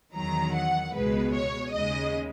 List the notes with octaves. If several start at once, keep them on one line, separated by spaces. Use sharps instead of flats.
E2 D#3 F#3 A#5
F#5
C#2 B2 G#3 B4
C#5
D#2 C#3 G#3 D#5